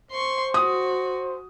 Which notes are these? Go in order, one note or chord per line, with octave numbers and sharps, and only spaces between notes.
C5 C6 C#6
F#4 D#6